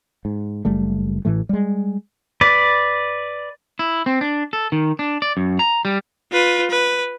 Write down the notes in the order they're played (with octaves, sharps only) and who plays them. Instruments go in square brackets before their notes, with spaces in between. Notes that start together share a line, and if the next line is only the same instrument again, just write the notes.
[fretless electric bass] G#2
F#1 G3 A3
A1 A2 E3 A3
G3 G#3
[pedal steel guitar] B4 D5
[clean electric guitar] E4
C4
D4
A4
D#3
D4
D5
F#2
A#5
G3
[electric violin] F4 B4
B4